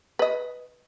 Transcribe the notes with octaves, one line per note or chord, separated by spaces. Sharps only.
B4 D#5